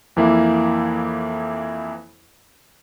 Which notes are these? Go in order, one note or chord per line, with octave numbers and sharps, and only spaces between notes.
F2 E3 A#3 E4